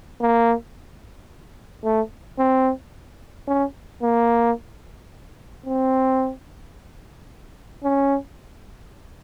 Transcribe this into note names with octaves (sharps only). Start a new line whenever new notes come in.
A#3
A3
C4
C#4
A#3
C4
C#4